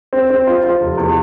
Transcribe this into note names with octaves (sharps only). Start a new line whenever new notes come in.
C4
C4
F4
F4
F1
E2